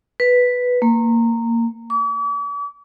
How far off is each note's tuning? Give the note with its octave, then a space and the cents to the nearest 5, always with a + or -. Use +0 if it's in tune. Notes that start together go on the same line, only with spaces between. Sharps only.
B4 +0
A#3 -15
D6 -45